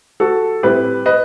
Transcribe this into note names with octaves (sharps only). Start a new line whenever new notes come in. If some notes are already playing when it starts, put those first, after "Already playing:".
F#4 A4
A2 G3 C4 E4 G4 B4
B4 D#5